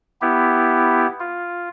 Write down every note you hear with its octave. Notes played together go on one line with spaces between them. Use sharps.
B3 E4 G4
F4